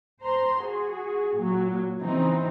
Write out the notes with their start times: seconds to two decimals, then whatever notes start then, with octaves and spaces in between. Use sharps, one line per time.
0.21 C5 A#5 C6
0.62 F#4 G#4
1.37 A#2 F#3
2.00 C#3 E3 C4 D#4